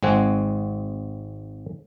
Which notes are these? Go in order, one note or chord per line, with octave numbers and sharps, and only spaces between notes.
G#1 G#3 C4 F#5 G#5